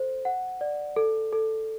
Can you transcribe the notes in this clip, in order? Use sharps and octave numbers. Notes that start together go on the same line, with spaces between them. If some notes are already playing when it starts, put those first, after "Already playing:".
Already playing: A4 C5
F#5
D5
A4
A4